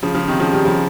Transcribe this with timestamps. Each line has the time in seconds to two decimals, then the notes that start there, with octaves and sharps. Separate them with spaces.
0.03 C#3 F3
0.15 C#3 F3
0.28 C3 D#3
0.40 C#3 F3
0.53 D#3 G3
0.65 C#3 F3